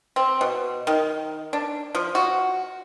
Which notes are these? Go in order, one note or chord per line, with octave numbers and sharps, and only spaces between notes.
C4
B2
D#3
D4
F3
F#4